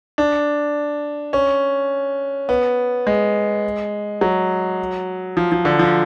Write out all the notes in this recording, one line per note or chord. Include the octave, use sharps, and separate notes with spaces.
D4
C#4
B3
G#3
F#3
F3
F3
D3
F3